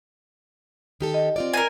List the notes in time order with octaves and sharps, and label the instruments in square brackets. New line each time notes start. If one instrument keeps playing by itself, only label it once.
[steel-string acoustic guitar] D#3 G4 A4
[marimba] D#5
[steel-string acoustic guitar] C4 F4 D5
[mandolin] A#4 G#5